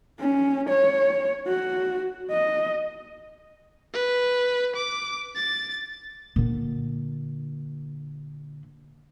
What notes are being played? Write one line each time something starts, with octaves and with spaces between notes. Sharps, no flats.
C#4
C#5
F#4
D#5
B4
D6
A6
A#2 D3